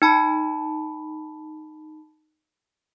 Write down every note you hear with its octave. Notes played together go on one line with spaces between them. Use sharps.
D#4 A5 B5